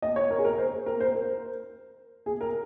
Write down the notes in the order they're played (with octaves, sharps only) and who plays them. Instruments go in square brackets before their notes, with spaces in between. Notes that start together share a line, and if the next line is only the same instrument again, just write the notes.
[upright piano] D#5
C#5
A#4
G#4
A#4
C5
A#4
C5
A#4
G#4
A#4